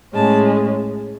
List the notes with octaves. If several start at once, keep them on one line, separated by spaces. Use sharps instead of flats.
A2 G#3 C#4 A5